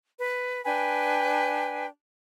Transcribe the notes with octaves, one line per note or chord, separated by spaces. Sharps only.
B4
D4 B4 G5 G#5